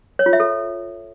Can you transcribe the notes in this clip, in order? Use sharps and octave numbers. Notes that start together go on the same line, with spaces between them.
C#5
F4
E5
A4